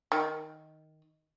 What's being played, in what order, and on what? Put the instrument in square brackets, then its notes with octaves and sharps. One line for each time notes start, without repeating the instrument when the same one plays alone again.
[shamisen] D#3